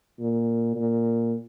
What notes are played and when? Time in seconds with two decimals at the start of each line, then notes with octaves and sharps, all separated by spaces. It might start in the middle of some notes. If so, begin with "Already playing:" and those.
0.19 A#2
0.75 A#2